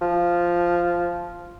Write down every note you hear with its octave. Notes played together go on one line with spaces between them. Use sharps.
F3